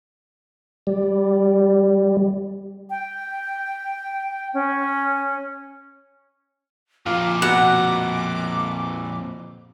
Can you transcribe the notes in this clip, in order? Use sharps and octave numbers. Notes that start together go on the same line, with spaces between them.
G3
G5
C#4
F2 A#2 F4 D6
B2 F#5